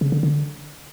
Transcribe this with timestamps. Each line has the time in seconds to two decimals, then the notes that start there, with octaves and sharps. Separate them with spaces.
0.01 C#3
0.12 D3
0.23 D3